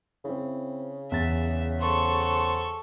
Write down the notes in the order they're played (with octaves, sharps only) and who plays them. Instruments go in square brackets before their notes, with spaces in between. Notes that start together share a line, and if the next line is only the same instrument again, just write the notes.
[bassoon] C#3 [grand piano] C4 E4
[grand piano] E2 A6 [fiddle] E5
[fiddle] A4 C#6 [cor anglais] C5